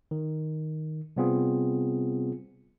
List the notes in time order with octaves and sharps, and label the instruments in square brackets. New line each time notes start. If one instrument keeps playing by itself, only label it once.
[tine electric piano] D#3
C3 G3 B3 C4 F4 G#4